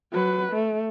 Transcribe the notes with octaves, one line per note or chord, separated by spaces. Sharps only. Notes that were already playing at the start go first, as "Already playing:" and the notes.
F#3 B4
A3